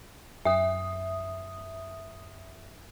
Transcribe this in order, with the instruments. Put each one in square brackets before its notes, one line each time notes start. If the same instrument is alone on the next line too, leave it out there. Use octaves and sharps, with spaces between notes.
[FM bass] F#2 [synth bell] E5 D#6